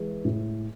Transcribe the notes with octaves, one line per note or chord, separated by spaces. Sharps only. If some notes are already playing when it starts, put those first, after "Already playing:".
Already playing: E3 G#3
A2